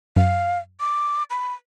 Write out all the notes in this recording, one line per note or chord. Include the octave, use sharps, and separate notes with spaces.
F#2 F5
D6
B5